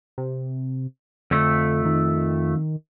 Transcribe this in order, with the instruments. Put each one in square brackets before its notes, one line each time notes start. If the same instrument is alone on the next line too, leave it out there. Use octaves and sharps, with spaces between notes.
[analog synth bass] C3
[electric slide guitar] F2 A3 [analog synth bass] D3
[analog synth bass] D#3